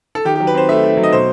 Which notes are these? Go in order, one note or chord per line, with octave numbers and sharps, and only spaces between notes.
A4
D#3 G4
F#3 G4
B4
C4 C5
A3 E5
A3
F#3
D#5
B2 C5